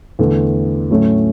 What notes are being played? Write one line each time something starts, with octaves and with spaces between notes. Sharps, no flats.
E2 D3 A3
A2 F#3 A3 C#4